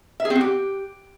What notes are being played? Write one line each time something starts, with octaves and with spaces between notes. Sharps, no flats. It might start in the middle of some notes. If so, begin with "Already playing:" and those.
E5
G#4
C4
F#4
G4